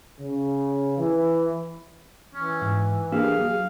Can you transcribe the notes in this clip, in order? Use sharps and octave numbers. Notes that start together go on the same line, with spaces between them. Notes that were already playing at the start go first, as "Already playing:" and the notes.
C#3
E3
E3 C#4
G#2
A#3 D4 G4 G#4 F5
F#3